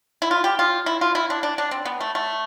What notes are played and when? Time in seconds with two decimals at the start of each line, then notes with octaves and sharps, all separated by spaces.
0.22 E4
0.31 F4
0.44 G4
0.59 F4
0.86 E4
1.01 F4
1.15 E4
1.30 D4
1.43 D4
1.58 D4
1.71 C4
1.85 B3
2.00 A3
2.15 A3